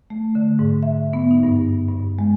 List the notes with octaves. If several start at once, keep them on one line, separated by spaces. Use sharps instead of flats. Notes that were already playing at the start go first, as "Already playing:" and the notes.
A3
D3
G#2
E5
B3
D#4
G2
G2
G#3